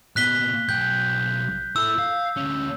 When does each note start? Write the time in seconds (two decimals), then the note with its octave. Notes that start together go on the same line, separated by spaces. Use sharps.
0.16 A#2 B3 F#6 B6 G7
0.69 B1 G5 G6
1.76 E4 A4 E6
1.99 F5
2.37 D2 C#4